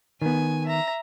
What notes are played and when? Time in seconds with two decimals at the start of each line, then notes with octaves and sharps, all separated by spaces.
0.22 D#3 B3 G#5
0.65 E5 A#5